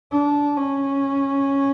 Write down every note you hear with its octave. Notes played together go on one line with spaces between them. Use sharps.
D4
C#4